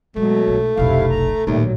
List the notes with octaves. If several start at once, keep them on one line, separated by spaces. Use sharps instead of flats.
B2 F#3 G#3 A3
B1
F1 B1 C3 E4 F5
A#5
A#1 D#2 A2 G3 A3
F#3